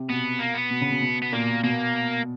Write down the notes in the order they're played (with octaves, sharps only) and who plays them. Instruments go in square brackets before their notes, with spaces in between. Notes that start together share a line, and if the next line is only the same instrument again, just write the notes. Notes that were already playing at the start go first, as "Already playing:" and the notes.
Already playing: [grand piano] C3
[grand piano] B2 [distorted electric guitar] B3
[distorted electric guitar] A#3
B3
[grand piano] B2
C#3
B2
B2
[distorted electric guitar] B3
[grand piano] A#2 [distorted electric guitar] A#3
[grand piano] B2 [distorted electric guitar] A#3